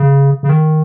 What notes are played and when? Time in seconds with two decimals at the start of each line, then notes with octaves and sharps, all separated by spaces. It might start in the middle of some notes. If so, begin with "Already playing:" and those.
Already playing: C#3
0.43 C#3
0.49 D#3